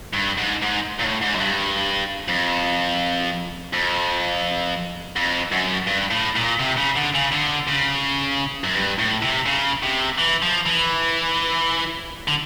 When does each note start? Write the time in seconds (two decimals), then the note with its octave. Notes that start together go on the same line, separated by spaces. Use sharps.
0.14 G2
0.38 G#2
0.62 G#2
1.00 A#2
1.04 A2
1.22 G#2
1.35 F#2
1.40 G2
2.29 F2
3.73 F2
5.16 F2
5.52 F#2
5.87 G2
6.11 A2
6.36 A#2
6.59 C3
6.77 C#3
6.95 D3
7.14 C#3
7.32 D3
7.67 C#3
8.64 F#2
8.75 G2
8.99 A2
9.22 C3
9.46 C#3
9.83 C3
10.18 E3
10.42 F3
10.66 E3
12.28 D3